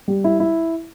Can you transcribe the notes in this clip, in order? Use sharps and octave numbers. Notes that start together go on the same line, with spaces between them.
G3
E4
E4